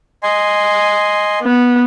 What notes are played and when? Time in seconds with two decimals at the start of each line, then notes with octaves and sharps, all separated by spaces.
0.23 D#5 G#5 C6
1.43 B3